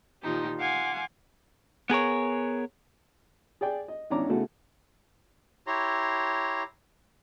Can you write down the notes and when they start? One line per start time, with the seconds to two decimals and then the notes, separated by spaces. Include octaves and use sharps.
0.23 A#2 D#3 F3 D#4 G4
0.59 F5 F#5 G#5 C6 D6
1.90 B3 G#4 A#4 C#5
3.61 G#4 D5 G5 G#5
3.88 D#5
4.10 G#1 E2 C#4 D4 A#5 D6
4.30 C#3 A3 B3 E4 F#4
5.67 E4 G4 C#5 A#5 C6